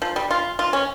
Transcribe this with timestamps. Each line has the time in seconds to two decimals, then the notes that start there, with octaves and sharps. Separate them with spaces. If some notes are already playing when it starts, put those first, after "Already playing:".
0.02 F3
0.16 G3
0.31 F4
0.59 F4
0.73 C#4